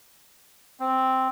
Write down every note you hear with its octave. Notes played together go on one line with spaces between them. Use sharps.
C4